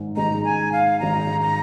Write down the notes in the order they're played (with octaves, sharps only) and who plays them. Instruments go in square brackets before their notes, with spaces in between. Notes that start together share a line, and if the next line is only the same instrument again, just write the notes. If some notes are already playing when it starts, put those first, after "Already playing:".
Already playing: [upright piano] G#1 G#2 G#3 D#4
[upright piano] G#1 G#2 G#3 D#4 [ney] A#5
[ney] G#5
F5
[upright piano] G#1 G#2 G#3 D#4 [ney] A#5
[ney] A#5